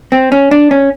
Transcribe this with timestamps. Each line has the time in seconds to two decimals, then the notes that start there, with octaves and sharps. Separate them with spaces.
0.12 C4
0.32 C#4
0.51 D4
0.71 C#4